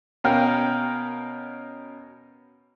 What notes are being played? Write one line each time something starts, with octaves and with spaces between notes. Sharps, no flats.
B2 C#4 A#4 F5 G5